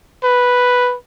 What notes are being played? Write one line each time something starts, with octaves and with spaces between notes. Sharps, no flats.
B4